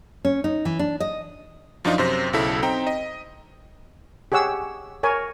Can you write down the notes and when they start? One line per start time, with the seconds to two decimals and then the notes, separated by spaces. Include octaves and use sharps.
0.25 C#4
0.44 D#4
0.65 E3
0.79 D4
1.00 D#5
1.84 F#2 F3 D4 D#4 F4
1.98 F#2 C3 C5 A#6
2.33 B1 C#3 E4 A4 B6
2.63 C4 D#4 G5 A#5
2.87 D#5
4.32 G4 G#4 C#5 F#5 E6
5.03 A#4 C#5 G#5